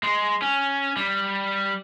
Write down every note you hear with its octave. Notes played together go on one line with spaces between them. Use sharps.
G#3
C#4
G3